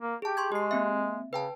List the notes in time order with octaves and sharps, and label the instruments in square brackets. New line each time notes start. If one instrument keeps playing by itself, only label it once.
[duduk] A#3
[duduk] G4 [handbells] G#4 A5
[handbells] C6 C#6 G#6
[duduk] G#3 [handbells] G4 C7
[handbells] A#3 C4 E5
[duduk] C#3 [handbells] B4 G5 A5